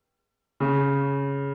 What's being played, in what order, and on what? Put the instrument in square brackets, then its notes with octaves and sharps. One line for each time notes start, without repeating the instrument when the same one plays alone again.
[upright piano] C#3